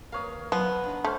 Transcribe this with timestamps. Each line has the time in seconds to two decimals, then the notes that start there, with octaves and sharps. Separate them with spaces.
0.12 D#2 A#4 B4 C#5 F5 D#6
0.52 F3 F#3 B3 G#5
0.84 D4 D#4
1.04 A3 C4 C#4 C5